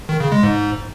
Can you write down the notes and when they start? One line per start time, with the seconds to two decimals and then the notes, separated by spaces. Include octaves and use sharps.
0.09 D#3
0.20 C#3
0.32 G#3
0.43 G#2